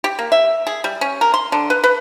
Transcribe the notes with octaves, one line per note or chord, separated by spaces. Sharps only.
G4
A#3
E5
G#4
G3
C#4
A#4
C6
D3
B4
B4